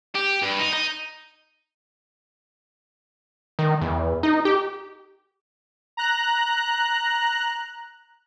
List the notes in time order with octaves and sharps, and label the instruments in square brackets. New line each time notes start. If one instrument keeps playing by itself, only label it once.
[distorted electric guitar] G4
G2
D#4
D#4
[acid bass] D#3
E2
D#4
G4
[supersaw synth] A#5 F#6